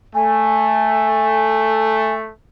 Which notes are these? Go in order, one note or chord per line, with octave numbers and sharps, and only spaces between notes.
A3 G#5